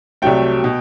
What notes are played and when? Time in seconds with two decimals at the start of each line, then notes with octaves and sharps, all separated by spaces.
0.22 C2 C3 F#3 A3 G5
0.64 B2